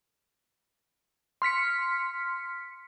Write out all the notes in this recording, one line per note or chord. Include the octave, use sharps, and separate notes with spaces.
C6 F6 B6 C#7